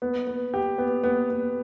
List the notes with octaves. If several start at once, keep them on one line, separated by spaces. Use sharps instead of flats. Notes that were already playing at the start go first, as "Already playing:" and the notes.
B3
B3
G4
B3
B3
B3